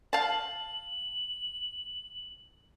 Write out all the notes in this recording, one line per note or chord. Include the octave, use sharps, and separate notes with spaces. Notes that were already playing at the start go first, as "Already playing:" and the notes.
F5 A5 F#7